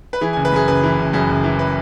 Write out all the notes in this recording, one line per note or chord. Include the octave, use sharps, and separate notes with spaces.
B4
E3 G#4
F#1 G#5
B4
F#2 G#4
F#1 B4
E3
F#1
F#2 G#4
F#1
E3
B4